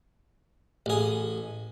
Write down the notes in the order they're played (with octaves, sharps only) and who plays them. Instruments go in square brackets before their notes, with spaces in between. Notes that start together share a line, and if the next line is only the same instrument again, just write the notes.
[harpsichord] A1 G#4